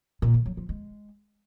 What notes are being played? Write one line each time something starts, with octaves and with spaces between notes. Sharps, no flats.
A#2
D#3
F#3
F3
G#3